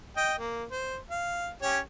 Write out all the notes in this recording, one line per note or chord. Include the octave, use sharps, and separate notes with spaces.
D#5 G5
A#3
C5
F5
C#4 G4 C#5